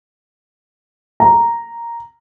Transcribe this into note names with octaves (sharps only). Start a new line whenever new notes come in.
A#5